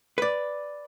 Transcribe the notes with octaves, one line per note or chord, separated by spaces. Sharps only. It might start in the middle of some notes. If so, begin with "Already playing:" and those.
B4 D5